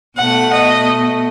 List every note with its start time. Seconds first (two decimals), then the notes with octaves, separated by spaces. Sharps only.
0.17 B2 A3 F#5
0.52 D#5